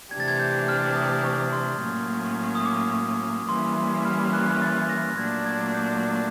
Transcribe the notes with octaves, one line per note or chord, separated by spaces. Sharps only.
C3 E3 A3 D4 G4 G#6
A6
G#6
G6
F6
D#6
C#6
C6
A2 F#3 A#3 C#4
D#6
D6
E3 G3 A#3 C#4 E4 C6
C6
F6
F#6
A6
A#6
A#2 F#3 A3 D4 G#6
G#6
G6